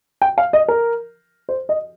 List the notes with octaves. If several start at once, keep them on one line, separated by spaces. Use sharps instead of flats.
G5
F5
D#5
A#4
C5
D#5